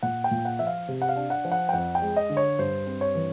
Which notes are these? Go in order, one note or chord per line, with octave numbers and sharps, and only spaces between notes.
A#2 F#5
G5
A#2
F#5
F3 E5
F5
C3
F#5
F5
D4
F#5
F3
F#5
G5
F2 F#5
G5
G#3
D#5
D3
C#5
G2 C5
C4
C#5
E3